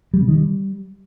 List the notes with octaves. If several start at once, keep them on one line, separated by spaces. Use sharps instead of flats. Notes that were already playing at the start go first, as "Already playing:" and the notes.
G3
C3
D#3
G3